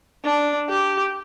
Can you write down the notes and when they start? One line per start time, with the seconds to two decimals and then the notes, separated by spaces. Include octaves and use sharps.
0.25 D4
0.69 G4